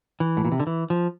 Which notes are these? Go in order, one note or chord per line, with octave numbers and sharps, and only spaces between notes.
E3
A2
A#2
C3
D3
E3
F3